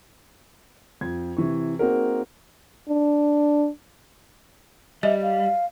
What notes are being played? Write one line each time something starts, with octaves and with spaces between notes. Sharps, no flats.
F2 G#6
C3 E3 C#6
A#3 C4 D#4 F#4 G#4 A#4
D4
G3 D#5 E5
F5